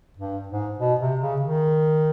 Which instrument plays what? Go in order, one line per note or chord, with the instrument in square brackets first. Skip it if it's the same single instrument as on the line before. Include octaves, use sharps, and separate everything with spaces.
[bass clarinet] G2
G#2
B2
C3
C#3
D#3